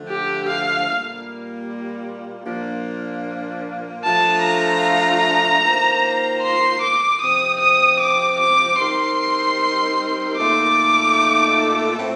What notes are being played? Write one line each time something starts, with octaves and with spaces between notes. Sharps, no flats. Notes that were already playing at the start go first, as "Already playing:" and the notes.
Already playing: D3 F3 A3
G4
F5
A#2 G3 A#3
A#2 F3 A#3 D4
F3 A3 D4 F4 A5
A#5
D#3 A#3 F4 C5
C6
D6
C3 F3 C4 D#6
D#6
D6
D6
G3 C4 D#4 A#4 C6
A#2 A3 D#4 A4 D6
A2 A3 C4